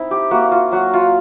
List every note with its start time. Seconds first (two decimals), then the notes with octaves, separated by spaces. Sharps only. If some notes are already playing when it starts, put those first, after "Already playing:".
Already playing: C4 D#4 E4
0.11 G4
0.31 A#3 F#4
0.52 F4
0.72 F#3 F#4
0.94 F4